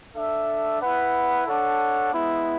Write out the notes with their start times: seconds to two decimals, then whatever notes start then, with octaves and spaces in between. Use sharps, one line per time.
0.16 D4 A4 E5
0.81 E4 B4 F#5
1.47 D4 A4 C#5 F#5
2.13 G#3 B3 E4